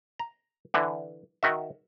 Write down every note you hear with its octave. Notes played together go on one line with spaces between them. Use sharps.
A#5
D3 E3
D#3 F#4 E5